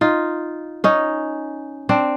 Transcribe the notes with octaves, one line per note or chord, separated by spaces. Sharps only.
D#4 F4
C#4 D#4
C4 D4